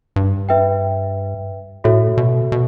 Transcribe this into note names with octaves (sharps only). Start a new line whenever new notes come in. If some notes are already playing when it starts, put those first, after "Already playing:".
G2
B4 E5 G5
A2 F#4 A4 C#5 E5
B2
B2